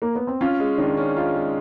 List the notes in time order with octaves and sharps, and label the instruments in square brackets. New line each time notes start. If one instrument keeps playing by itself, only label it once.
[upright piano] A#3
B3
C4
[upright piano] C#4 [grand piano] F4
[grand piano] G#3
[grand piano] D#3 [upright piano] D4
[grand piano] C#4
[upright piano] D#4 [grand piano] F4
[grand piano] G#3